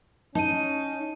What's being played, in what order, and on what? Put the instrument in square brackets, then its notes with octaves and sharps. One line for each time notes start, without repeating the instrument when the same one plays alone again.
[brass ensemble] C#4 [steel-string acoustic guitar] D#4 [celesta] A5 D#7